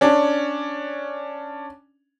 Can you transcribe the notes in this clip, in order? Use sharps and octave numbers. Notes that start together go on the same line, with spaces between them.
C#4 D4